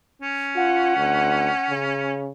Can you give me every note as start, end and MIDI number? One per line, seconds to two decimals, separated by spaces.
0.22 2.27 61
0.56 0.94 65
0.56 1.70 78
0.97 1.51 38
1.70 2.31 49